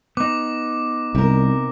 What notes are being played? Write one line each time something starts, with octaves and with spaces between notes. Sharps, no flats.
B3 D#4 D6
C2 C3 A#4